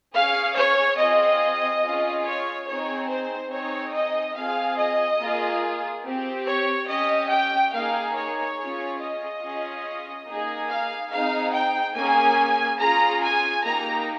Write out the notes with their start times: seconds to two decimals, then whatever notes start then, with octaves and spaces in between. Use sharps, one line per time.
0.13 C#4 G#4 F5
0.55 C#5
0.97 C4 F4 G#4 D#5
1.82 C#4 F4 G#4
2.24 C#5
2.67 C4 D#4 G#4 C#5
3.08 C5
3.51 C4 D#4 G#4 C#5
3.93 D#5
4.35 C4 F4 G#4 F5
4.78 D#5
5.19 A#3 F4 G#4
6.04 C4 G4
6.47 C#5
6.88 C#4 G4 D#5
7.30 G5
7.73 A#3 D#4 G#4 F5
8.16 C#5
8.58 C#4 F4 G#4
9.00 D#5
9.42 C#4 F4 G#4
10.26 A#3 D#4 G#4
10.69 F5
11.10 C4 D#4 G#4 F5
11.53 G5
11.95 A#3 C#4 G#4 G#5
12.79 C#4 F4 G#4 A#5
13.22 G#5
13.64 A#3 D#4 G4 A#5